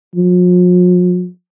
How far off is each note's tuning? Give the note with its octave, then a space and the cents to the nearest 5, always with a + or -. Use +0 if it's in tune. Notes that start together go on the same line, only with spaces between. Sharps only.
F3 +45